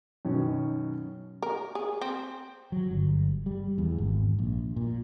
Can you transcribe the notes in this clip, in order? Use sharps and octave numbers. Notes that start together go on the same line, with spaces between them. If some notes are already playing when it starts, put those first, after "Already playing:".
F#2 B2 D#3 C#4
A#4
G#4
C4
F#3
G1
G3
E2
G#1
A#1
A#2